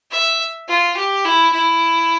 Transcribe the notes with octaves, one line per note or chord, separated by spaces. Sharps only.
E5
F4
G4
E4
E4